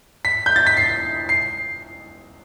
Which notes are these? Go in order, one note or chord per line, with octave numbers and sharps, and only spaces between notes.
B6
G6
A6
B6
C7
C7